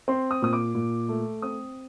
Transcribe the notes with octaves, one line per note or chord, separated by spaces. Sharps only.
C4 C6
D#6
A#2 D#6
D6
A#2
A3
C4 D#6